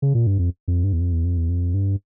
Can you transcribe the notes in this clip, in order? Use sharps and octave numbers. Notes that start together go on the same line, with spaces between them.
C#3
A#2
G2
F2
F2
G2
E2
F2
E2
F2
E2
F2
G2